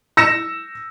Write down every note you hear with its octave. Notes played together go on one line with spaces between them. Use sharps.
E6 A#6 C#7 E7